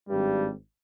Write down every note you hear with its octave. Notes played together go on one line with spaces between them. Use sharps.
G#1 G2 G3